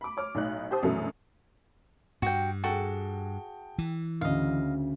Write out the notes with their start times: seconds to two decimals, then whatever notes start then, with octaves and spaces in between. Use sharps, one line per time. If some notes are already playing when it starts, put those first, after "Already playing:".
0.01 B5 D6
0.17 C#5 D6 F6
0.35 B1 A2 D#4 F#6
0.71 G4 C5 A5 D#6
0.82 A#1 F#2 B2 E3 F#3 A3
2.22 G2 F#4 G5
2.64 F#4 G#4 A4 G5
3.78 E3
4.21 D2 C#3 D#5 F5